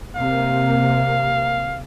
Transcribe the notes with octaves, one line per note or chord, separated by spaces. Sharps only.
C3 A#3 F5